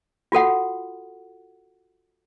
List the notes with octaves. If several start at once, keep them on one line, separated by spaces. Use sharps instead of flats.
F4 F#4 A4 F#5